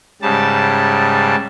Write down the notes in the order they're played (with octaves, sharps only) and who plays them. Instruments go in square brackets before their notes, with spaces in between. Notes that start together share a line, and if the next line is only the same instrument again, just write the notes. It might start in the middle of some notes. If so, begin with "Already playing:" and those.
[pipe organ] G#2 C#3 G3 A5